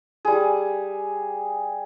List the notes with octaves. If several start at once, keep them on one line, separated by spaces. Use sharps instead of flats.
G3 G#4